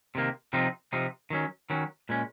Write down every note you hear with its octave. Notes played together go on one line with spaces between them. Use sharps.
C3 D#3 A#3
C3 F3 C4 D#4
C3 F3 C4 D#4
D#3 F#3 C#4
D#3 F#3 C#4
A#2 G#3 C#4